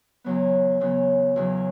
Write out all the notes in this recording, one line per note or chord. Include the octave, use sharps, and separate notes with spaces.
E2 C#3 F#3 B3
E2 C#3 F#3 B3
E2 C#3 F#3